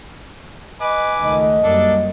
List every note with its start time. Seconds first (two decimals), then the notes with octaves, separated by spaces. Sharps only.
0.81 B4 D#5 G#5 D6
1.21 C#2 D#3 A3 D#5
1.63 F#2 G3 A#3 D4 A4